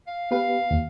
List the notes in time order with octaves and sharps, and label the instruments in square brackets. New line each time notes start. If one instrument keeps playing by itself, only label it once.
[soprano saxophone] F5
[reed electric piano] B3 G4 B4 [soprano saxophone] F5
[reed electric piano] D#2